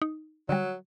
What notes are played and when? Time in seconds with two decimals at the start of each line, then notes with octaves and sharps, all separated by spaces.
0.02 D#4
0.49 D3 F#3 G3